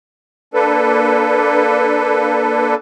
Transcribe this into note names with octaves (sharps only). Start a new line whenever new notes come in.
A#3 D4 A4 B4